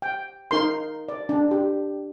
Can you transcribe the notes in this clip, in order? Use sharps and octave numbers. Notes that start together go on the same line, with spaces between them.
G5
D#4 A#4 C6
D5
D4
G4